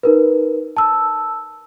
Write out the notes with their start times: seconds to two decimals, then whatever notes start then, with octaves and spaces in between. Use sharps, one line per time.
0.03 D#4 A#4 B4
0.77 A5 E6